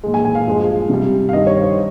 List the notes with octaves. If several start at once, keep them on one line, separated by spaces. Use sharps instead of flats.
A#2 G#3
G#5
G#5
F5
G2 F3 G#3
C3 G3
F5
G2 D#3 G3 D#5
C#5
C5